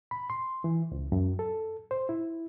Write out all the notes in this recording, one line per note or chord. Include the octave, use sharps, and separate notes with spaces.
B5
C6
E3
C#2
F#2
A4
C5
E4